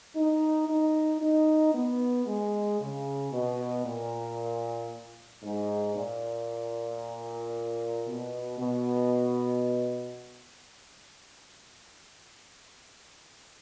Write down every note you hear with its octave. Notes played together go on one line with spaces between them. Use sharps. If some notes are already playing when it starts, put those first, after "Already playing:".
D#4
D#4
D#4
B3
G#3
C#3
B2
A#2
G#2
A#2
B2
B2